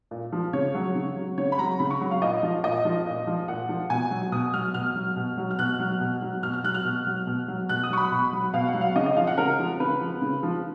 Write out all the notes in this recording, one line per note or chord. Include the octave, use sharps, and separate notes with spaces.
A#2
F3
C#3 C#5
F#3
C#3
F#3
C#3 C#5
B5
F#3 A#5
C#3 B5
C#6
F#3
F5
A#2 D#5
F3
A#2 D#5
F3
A#2
F3
A#2 F#5
F3
B2 G#5
F#3
B2 D#6
F#3 F6
B2 F6
F#3
B2
F#3
F6
B2 F#6
F#3
B2
F#3
B2 F6
F6
F#3 F#6
F6
B2
F#3
B2
F#3
B2 F#6
D#6
F#3 C#6
B5
B2
F#3
B2 F5
F#5
F#3
F5
C#3 D#5
D#5
F3 F5
F#5
C#3 A#4
F3
C#3 B4
F3
C#3
F3